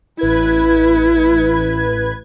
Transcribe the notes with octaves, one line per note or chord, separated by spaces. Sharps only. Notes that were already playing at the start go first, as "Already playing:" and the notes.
A1 E4 B4 G#6